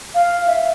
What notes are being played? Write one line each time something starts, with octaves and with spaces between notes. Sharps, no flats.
F5
E5